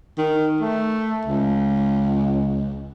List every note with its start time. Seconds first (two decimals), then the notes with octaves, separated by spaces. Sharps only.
0.17 D#3
0.61 A3
1.25 C#2